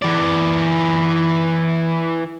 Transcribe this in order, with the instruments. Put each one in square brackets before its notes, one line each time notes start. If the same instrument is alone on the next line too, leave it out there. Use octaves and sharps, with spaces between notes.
[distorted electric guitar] E3 D5